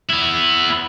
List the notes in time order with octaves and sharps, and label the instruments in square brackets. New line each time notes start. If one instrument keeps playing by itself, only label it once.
[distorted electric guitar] B3 E4